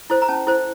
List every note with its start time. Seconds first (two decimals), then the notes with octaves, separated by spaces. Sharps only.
0.10 E4 A4 C5
0.22 A#5
0.28 C#4 A5
0.47 E4 A4 C5